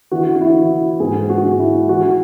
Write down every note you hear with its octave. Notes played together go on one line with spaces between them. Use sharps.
E3 F#4
F#4
E4
E3
G#2 G#4
F#4
G#2
E4
E3 F#4